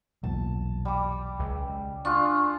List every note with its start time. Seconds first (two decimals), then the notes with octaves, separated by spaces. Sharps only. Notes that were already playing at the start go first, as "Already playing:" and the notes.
0.24 B1 E2 A#2 A5
0.85 G3 D6
1.39 C#2
2.05 D4 F4 G#4 C#6